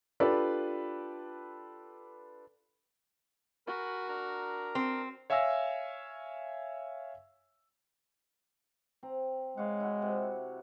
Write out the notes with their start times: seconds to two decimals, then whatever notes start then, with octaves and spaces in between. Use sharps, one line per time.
0.20 D4 F4 G4 A4 B4 D5
3.67 F#4 A#4 G#5 B5
4.08 D4 A#4 A#5
4.75 C4
5.30 C#5 E5 F5 G#5 E6 A#6
9.03 C4 A#5
9.57 G#3 C#5 F5 F#5
9.80 E4 F#4
10.02 C3